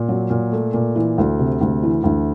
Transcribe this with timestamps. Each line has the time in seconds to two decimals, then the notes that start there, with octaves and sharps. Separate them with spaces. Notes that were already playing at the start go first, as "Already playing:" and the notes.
Already playing: A#2
0.08 F#3
0.30 A#2
0.52 A3
0.73 A#2
0.96 E3
1.18 D2
1.39 C3
1.61 D2
1.83 E3
2.04 D2